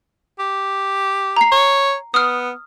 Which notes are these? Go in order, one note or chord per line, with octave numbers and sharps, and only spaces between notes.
G4
A#5 C7
C#5
B3 D#6 F6